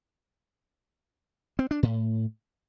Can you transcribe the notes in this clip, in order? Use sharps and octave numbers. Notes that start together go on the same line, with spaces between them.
C4
D4
A2